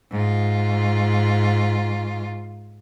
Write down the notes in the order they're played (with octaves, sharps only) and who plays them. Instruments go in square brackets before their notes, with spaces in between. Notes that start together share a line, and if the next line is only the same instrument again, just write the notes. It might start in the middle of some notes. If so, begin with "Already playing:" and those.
[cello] G#2 F4